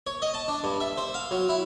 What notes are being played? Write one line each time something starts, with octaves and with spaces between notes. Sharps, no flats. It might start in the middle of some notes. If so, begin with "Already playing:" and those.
C#5
D#5
A5
D4
G2
E5
C5
F5
F#3
E4